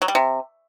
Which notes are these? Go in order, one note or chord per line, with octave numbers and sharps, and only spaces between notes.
F#3
G3
C3